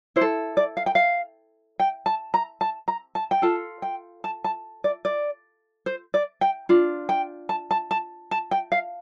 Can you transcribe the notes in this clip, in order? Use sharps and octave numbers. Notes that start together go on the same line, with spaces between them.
E4 C5
A4
D5
F5
G5
F5
G5
A5
A#5
A5
A#5
A5
G5
F4 A4 A5
G5
A5
A5
D5
D5
C5
D5
G5
D4 F4
G5
A5
A5
A5
A5
G5
F5